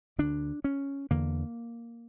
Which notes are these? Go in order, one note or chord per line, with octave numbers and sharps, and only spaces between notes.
D2 D3 D4
C#4
E2 D3 A#3